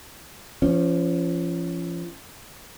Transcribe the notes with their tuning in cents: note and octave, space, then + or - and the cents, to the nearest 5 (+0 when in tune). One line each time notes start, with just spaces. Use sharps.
F3 -30 C#4 +0